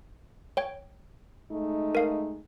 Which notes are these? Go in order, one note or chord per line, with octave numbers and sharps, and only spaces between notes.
C#5 G5
G#3 A3 D#4
A#4 F5